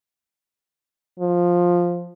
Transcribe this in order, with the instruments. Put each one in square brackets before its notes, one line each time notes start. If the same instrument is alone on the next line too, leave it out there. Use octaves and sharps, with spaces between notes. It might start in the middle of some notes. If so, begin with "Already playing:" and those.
[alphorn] F3